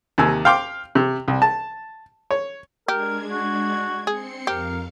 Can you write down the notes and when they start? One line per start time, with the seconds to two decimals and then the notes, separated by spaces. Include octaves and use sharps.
0.18 D#2 C3 G#5 E6
0.45 F5 G5 C6 D6
0.95 C3
1.28 C2
1.42 A5
2.31 C#5
2.88 G#3 D4 G4 A#4 G#6
3.31 F#4
4.07 C4 G#4 C6 C#7
4.47 F2 G4 A#4 F5